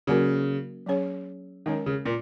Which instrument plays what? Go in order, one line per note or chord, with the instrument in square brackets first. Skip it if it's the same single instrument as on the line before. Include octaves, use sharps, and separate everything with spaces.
[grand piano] C#3 [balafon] F#3 A#3 C#4 F#4 A#4
[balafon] F#3 C#4 G#4 C#5
[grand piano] D#3 [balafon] G#3 C#4 A#4 C#5
[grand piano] C#3
A#2